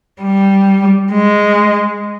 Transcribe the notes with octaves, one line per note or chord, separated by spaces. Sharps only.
G3
G#3